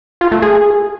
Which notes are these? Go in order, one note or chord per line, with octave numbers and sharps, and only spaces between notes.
F4
A3
G#4